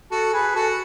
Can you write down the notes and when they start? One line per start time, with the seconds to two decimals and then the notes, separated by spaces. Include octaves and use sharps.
0.11 F#4 A4
0.33 G#4 B4
0.56 F#4 A4